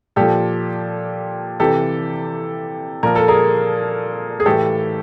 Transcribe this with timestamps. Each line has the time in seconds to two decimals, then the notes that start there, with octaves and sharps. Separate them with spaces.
0.16 A#2 F3 G4 A4
1.60 C3 E3 G4 A4
3.03 A#2 F3 A#4
3.15 A4
3.28 G#4 A#4
4.40 G#4
4.46 A2 E3 G4 A4